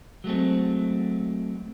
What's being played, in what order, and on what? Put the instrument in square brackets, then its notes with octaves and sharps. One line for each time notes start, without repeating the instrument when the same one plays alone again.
[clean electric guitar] F#3 G#3 A3 C4